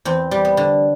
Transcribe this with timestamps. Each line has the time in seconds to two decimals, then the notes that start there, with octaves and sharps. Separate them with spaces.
0.05 E2 C4
0.31 G3
0.45 B3
0.57 D3